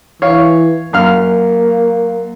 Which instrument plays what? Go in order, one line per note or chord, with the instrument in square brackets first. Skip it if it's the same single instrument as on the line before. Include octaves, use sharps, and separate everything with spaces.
[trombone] E3 [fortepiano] C#5 F5
[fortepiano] F#2 F5 F6 [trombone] A#3